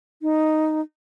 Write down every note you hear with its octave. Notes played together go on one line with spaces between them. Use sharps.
D#4